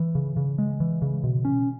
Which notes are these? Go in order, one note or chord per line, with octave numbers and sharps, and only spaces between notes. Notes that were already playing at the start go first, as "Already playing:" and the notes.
Already playing: E3
C#3
C#3
G#3
E3
C#3
B2
C#4